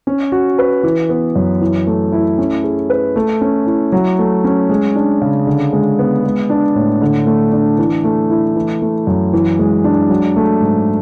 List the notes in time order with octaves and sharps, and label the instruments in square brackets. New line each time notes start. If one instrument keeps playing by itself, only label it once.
[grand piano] C#4
F#4
B4
E3
B3
F#2
E3
A3
E4
C#4
G#4
B4
A3
C#4
E4
F#3
A3
C#4
G#3
D4
C#3
D3
G#3
B3
G#3
D4
A2
D3
A3
D4
E3
A3
E4
E3
A3
F#2
E3
G#3
D4
F#3
A3
G#2